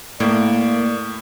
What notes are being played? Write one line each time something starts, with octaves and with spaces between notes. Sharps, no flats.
A2 A#3 D5